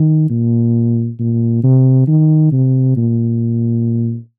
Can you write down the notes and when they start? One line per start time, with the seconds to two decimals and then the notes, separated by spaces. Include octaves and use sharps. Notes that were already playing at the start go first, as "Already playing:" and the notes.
Already playing: D#3
0.30 A#2
1.19 A#2
1.63 C3
2.08 D#3
2.52 C3
2.96 A#2